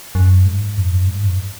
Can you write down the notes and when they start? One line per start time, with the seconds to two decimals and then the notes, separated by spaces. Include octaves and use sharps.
0.15 F#2
0.46 G#2
0.77 F2
0.92 F#2
1.07 G#2
1.23 F#2